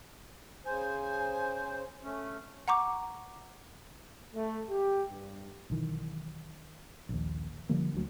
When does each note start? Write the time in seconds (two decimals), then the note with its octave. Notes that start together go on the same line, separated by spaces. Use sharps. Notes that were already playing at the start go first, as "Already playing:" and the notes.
0.65 C#3 C5 G#5
2.02 A3 C#4
2.68 F#5 A#5 C#6 D6
4.35 A3
4.70 G4
5.10 G2
5.70 B1 D#3 E3
7.09 A#1 D#2
7.69 D3 F3 G3 A#3
7.94 D2 F#3